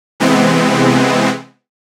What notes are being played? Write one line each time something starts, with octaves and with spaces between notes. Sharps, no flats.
C3 E3 G#3 B3 C4